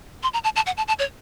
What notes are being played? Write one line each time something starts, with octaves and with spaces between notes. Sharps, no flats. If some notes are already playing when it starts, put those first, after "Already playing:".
C6
A#5
A5
A5
F#5
A5
A5
C#5